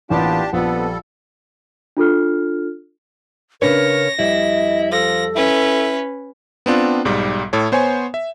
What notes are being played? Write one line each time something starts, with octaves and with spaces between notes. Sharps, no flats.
A1 A#2 B3 D4 F4 G4 A5
A#1 F2 F3 G3 B3 A4
D4 F4 A4 F6
C#3 D4 A#4 B4 C#5 A#6
F2 G3 E4 D#5
F3 A4 A#6
C#4 E4 B4
B3 C4 D4 F4
B1 G#2 G3 D6
A2 A4 C#5
B3 C5 C#5 G#5
E5